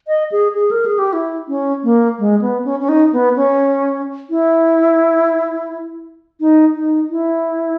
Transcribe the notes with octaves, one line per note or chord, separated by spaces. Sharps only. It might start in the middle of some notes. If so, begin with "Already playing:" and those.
D#5
G#4
G#4
A#4
G#4
G4
E4
C#4
A#3
G#3
B3
C#4
C#4
D#4
B3
C#4
E4
D#4
D#4
E4